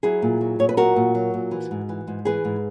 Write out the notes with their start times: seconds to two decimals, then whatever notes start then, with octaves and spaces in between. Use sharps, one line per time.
0.03 F#3 E4 G#4
0.22 A#2
0.41 F#3
0.59 A#2 C#5
0.69 B4
0.77 F#3 F#4 A#4
0.96 A#2
1.15 F#3
1.34 A#2
1.51 E3
1.71 G#2
1.89 E3
2.07 G#2
2.25 E3 G#4 B4
2.45 G#2